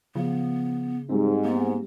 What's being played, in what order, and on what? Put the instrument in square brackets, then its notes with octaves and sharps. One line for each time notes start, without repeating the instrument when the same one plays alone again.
[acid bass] C#3 [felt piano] F3 [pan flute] B3
[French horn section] G#2 [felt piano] G3 G#3 C4
[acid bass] A#3 [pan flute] B3